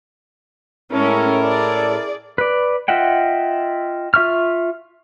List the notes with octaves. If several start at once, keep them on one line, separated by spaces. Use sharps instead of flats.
A2 G#3 C#4 E4 A4 A#4
G#4 D5
B4 D5
F4 D#5 E5 F#5 G5
F4 E5 C#6 F6